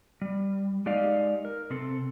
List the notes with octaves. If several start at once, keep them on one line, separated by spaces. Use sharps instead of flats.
G3
G#3 D#4 G4 D5 D#5 F5
A#4
C3 C4 A4